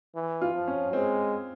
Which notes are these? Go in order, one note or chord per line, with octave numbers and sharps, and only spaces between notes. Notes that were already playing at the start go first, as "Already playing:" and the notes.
E3
F4
F3
C#4
G#3 C4